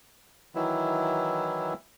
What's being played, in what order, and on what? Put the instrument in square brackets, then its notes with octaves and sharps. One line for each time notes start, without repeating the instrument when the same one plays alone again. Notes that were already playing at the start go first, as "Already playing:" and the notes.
[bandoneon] D#3 E3 F#3 E4